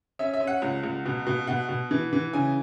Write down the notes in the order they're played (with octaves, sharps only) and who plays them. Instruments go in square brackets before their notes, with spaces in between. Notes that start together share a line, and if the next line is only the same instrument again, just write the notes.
[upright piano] C#4 E5
E5
C#4
F#5
C#2
C#2
B2
B2
B2 F#5
B2
E3
E3
C#3 G#5